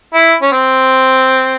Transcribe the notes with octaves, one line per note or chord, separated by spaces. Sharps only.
E4
C#4
C4